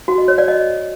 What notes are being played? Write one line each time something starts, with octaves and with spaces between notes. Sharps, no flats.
F#4
D#5
C#5
D5
D#5